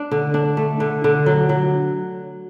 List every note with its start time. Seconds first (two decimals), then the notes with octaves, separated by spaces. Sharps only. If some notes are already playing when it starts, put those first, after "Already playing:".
Already playing: D4
0.11 D3
0.34 D4
0.57 A3
0.80 D3
1.04 D3
1.26 F#3
1.49 F#3